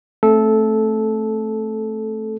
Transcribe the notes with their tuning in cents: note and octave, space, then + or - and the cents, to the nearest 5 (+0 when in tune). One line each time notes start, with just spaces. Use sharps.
A3 +0 C4 +35 A4 -15